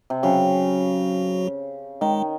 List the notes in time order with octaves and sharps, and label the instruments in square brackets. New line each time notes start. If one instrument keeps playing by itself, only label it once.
[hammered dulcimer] C3
[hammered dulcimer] C#3 [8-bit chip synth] F#3 F#4
[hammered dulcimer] D#3 [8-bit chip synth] G#3